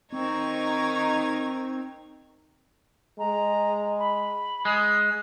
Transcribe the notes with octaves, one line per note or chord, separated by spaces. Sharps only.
D#3 C4 D#4 A#4 C#6 G#6
G#3 A#5
B5
G#3 D#6